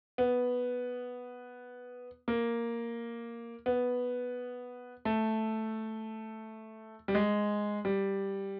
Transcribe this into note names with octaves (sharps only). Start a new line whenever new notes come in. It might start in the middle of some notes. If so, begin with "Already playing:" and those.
B3
A#3
B3
A3
G3
G#3
G3